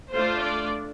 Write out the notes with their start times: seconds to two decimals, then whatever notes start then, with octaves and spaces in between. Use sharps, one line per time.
0.12 A3 D4 F4 C5
0.41 D5